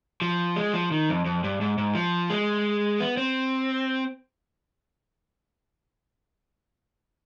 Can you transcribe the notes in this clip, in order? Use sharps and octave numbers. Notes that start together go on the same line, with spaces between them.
F3
G#3
F3
D#3
F2
F2
G2
G#2
G#2
F3
G#3
B3
C4